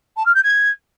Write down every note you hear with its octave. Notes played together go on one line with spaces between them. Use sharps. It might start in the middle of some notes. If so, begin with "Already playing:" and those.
A5
F6
G6
G#6